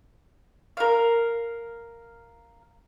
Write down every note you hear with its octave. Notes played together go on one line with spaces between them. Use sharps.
A#4 F5